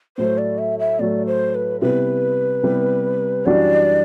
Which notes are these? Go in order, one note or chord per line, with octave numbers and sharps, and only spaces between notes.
A2 F#3 A3 C5
D5
E5
E5
A2 F#3 A3 D5
C5
B4
C3 G3 B3 E4 B4
C3 G3 B3 E4
F#2 E3 G3 D4 F#4 D5